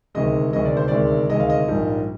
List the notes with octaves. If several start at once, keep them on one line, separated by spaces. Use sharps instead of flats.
D2 C3 D#3 G#3 D#5
D2 C3 D#3 G#3 D#5
D5
C5
D2 C3 D#3 G#3 D5
D2 C3 D#3 G#3 D#5
F5
D#5
A#1 G#2 G3 A#3